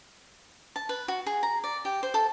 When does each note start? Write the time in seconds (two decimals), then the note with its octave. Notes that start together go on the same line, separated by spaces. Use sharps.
0.76 A5
0.89 B4
1.08 F#4
1.26 G#4
1.43 A#5
1.64 D5
1.85 G4
2.03 C5
2.14 A4